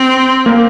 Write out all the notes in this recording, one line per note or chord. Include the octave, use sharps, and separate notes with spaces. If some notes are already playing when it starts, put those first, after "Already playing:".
Already playing: C4
A#3